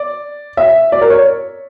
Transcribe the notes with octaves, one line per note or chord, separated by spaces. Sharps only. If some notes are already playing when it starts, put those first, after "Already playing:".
Already playing: D5
E5
D5
A#4
C#5